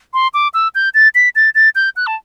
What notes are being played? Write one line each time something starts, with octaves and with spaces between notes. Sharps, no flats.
C6
D6
E6
G6
A6
B6
A6
A6
G6
F#6
A5